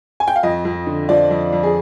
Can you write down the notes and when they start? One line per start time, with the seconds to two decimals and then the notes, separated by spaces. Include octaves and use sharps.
0.20 G#5
0.28 G5
0.36 F5
0.43 F2 D#5
0.65 F2
0.86 D3
1.09 F3 D5
1.31 F2
1.52 F2
1.63 G#4